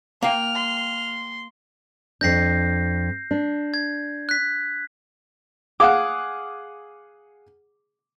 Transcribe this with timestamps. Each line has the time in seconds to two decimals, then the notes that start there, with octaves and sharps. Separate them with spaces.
0.22 A#3 F5 G5 F6
0.55 C6
2.21 F2 D4 G6 A#6 C7
3.31 D4
3.74 G#6
4.29 F#6 B6
5.80 G#4 F5 F#5 D6